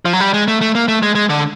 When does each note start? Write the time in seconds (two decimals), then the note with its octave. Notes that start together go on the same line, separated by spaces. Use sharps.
0.05 F3
0.13 F#3
0.20 G3
0.34 G#3
0.48 A3
0.61 A3
0.75 A#3
0.88 A3
1.03 G#3
1.15 G#3
1.30 D3